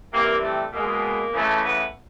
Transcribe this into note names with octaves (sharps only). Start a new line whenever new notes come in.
C3 E3 G3 A#3
A3
B2 G#3 A#3
C#3 E3 A3
A3 B3